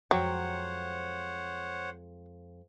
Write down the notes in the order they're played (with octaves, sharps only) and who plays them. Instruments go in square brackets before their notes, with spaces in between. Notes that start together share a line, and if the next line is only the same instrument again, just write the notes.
[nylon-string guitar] F2 G#3 G5 [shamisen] F#3 [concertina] C5 C#5 F#5